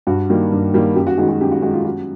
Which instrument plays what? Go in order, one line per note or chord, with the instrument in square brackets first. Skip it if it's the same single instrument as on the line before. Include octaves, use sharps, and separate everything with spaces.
[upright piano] G2 F#4
D#3 G3 A#3
G2
D#3 G3 A#3
F#2 G4
F#4
D#3 G#3 F#4
F#4
F#2 G4
F#4
D#3 G#3 F#4
F4
F#2 F#4